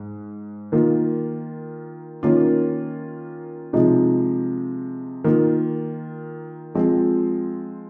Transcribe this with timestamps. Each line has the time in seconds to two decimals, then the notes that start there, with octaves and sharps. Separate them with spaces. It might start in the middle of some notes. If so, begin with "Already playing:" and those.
Already playing: G#2
0.72 D#3 A#3 F4
2.23 D#3 A#3 C#4 F4
3.73 C3 F3 G#3 D#4
5.24 D#3 A#3 F4
6.75 F3 G#3 C4 F4